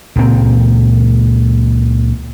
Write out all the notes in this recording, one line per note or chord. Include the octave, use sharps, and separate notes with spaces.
C#2 A#2 C4